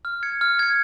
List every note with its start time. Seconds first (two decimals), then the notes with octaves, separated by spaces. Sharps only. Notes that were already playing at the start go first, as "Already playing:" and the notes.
0.05 F6
0.23 G#6 C#7
0.41 F6
0.59 G#6 C#7